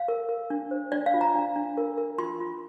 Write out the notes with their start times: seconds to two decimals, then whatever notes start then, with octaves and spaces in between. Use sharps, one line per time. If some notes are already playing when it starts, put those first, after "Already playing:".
Already playing: F5
0.08 A#4
0.29 A#4
0.50 D4
0.71 C5
0.92 D4 D5
1.06 F5
1.14 F4
1.21 A#5
1.35 D4
1.56 D4
1.77 A#4
1.98 A#4
2.19 F4 C6
2.40 F4